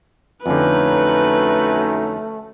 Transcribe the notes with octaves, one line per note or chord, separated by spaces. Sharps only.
F2 D3 F#3 A3 C#4 D#4 B4